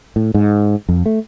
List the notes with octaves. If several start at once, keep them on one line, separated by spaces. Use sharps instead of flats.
A2
G#2
F2
A3